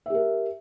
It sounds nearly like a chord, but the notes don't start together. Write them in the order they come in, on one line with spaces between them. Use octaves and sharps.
E5 G4 A#4